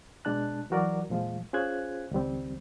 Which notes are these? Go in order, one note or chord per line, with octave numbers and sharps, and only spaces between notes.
B2 G#3 D4 A5 F#6
E3 F#3 F#4 A#4 D5
E2 A#2 F3 G#3 F4
C#4 F4 G#4 C5 F#6 G#6
C#2 D#3 G3 C4